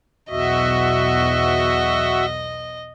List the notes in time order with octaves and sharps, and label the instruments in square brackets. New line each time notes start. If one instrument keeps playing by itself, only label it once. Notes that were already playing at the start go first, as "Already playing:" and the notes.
[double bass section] B1 E2 [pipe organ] F#4 E5 [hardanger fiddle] D#5